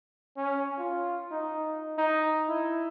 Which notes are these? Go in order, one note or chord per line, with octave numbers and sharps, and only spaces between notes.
C#4
F4
D#4
D#4
E4